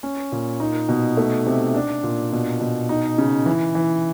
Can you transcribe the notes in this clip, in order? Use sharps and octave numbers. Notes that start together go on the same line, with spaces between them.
C#4
A#2
D#4
B2
A3
C3
D4
A#2
B2
B2
D#4
C#3
E3
E3